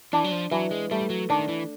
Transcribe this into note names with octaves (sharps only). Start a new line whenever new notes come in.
E3 D4
F#3
F3
E3 F#3
G#3
G3 A3
F#3
D#3 D4
E3